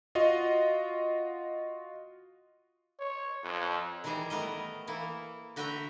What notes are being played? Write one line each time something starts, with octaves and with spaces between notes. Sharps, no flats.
F4 F#4 D#5
C#5
F2
D#3 E3 G3 G#4 A#5
A3 B3 A#4 D#5
E3 A#3 E4
D3 F#4 B4 E5 G5 A#5